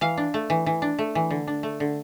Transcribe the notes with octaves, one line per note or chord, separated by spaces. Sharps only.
E3 F5
D4
A3
E3
E3
D4
A3
E3
D3
D4
A3
D3